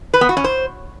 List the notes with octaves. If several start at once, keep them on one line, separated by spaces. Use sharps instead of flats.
B4
B3
F#4
C#4
C5